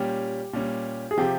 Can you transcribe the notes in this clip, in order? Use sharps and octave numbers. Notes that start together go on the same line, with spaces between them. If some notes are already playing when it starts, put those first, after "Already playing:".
Already playing: A#2 G3 C#4 G4
A#2 G3 C#4
G#4
C3 F3 G4